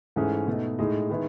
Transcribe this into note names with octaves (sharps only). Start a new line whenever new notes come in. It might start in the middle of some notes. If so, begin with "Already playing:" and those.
G#2 E3 A3 C#4 G#4
B2 A3 D#4
A2 G#3 D#4
D#3 G#3 B3 E4